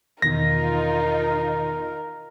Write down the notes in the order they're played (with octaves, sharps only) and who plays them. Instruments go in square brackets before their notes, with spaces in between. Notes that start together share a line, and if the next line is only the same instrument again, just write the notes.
[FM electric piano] E2 B2 D#3 [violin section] D#4 F4 [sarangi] A#4 [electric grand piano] A#6